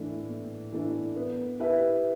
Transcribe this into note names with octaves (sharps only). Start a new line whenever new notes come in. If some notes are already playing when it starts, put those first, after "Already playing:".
Already playing: A2 E3 A3 D4
A2
E3 A3 D4
B3
E4 G4 B4 E5